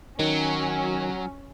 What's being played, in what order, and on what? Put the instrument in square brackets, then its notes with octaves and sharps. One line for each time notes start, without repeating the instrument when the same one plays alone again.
[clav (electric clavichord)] D#3 [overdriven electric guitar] F#3 [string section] C#4